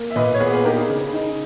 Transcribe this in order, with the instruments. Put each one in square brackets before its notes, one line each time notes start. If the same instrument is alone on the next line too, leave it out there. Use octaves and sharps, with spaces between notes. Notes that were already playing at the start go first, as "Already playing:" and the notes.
Already playing: [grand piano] A#3
E5
A#2 B4 D#5
C#5
B3 G#4 B4
G#4 B4
D#4 G4 A#4
G#4
C#3
D#4